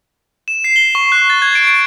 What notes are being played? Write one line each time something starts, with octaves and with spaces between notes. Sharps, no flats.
E7
C7
G7
C#6
F#6
A6
G#6
D7
D7